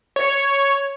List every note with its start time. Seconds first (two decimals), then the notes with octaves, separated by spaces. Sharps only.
0.16 C#5